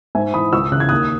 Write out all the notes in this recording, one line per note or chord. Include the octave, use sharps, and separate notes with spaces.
G#2 E5 G#5
E3 B5 D#6
C#2 C#6 E6
C#3 E3 F#6 G#6
D#2 D#6 F#6